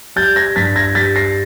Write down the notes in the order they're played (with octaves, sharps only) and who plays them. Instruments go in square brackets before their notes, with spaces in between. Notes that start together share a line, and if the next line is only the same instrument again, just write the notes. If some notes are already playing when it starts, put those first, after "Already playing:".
[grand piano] G3 G6 A6
G#6 A#6
G2 A6 B6
G#6 A#6
G3 A6 B6
A#6 C7